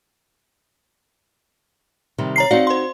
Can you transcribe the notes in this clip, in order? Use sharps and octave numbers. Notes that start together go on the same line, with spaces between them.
C3 D#3 G3
C#5 A#5 C7
C4 D#4 F#4 D5 F5
C5 C6